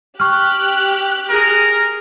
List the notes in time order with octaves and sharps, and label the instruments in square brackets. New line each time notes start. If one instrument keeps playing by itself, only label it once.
[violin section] G4 F#6 [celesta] C#6 F6
[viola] G#4 [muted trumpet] A#4